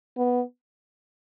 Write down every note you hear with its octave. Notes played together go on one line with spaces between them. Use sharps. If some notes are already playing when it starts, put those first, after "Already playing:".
B3